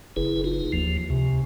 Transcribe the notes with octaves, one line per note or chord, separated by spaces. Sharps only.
F#1 E4 G#4 B4
D#4 F4
D#2 F3
C#2 C3